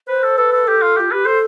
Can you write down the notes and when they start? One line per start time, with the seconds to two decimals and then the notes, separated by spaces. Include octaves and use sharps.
0.08 B4 C5
0.23 A4
0.38 A4 B4
0.53 A4
0.67 G4 A4
0.82 F4
0.97 F4 G4
1.12 G4 B4
1.25 A4 C5